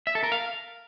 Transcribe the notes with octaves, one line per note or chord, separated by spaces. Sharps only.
E5
A4
A#4
F5